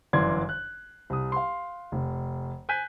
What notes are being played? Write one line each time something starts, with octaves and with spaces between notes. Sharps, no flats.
G1 F#2 E3 D5 C6 G#6
F#6
C2 D#6
F5 C6
F1
G#5 F#6 G6 B6 D#7